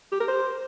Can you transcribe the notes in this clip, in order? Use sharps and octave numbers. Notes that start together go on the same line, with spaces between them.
G4
A#4
C5